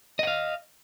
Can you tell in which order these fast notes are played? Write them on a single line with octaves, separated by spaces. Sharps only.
D#5 F#5 F5